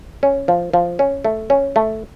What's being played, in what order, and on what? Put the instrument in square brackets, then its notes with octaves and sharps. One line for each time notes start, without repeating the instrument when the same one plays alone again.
[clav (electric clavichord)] C#4
F3
F3
C#4
A3
C#4
A3